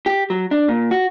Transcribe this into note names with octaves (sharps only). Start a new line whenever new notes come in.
G4
F#3
D4
A#2
F#4